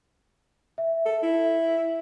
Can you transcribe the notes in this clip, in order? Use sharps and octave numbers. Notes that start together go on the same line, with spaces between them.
E5
A4
E4